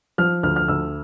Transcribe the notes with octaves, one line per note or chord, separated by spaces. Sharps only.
F3 F6
D2 F6
F6
D2 E6